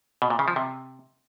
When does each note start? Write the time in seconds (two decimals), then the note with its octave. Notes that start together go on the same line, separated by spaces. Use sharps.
0.22 B2
0.30 A#2
0.39 C#3
0.48 F3
0.56 C3